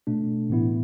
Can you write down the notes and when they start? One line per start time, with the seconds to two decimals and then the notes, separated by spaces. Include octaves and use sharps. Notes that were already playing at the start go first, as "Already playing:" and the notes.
0.07 B2 A3 D4
0.50 A2 E3 B3 E4